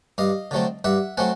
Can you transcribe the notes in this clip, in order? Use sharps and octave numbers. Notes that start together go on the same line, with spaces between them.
G2 D#5 F5
D3 F#3 A3 C4
G2 E5 F#5
F#3 A3 C4 F#5 G#5